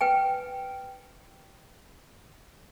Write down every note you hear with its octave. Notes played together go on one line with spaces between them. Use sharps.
B4 G5 G#5